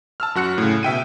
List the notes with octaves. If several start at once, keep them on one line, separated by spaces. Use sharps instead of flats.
A5 E6 F6
F#2 F#4 F#6 C#7
A2 C#3
B2 E5 G5 D#7